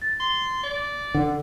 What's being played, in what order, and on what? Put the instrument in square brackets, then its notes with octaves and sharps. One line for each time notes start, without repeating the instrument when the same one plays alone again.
[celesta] A6
[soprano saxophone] C6
D5
[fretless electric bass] D3 [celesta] F#5